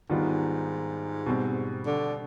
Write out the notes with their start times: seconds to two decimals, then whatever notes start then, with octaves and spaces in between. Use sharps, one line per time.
0.10 G#2 D#3 G3 B3 D4 F4
1.26 B2 G3 C4
1.85 D3